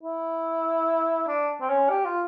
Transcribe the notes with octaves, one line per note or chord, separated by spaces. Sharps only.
E4
D4
C4
C#4
G4
F4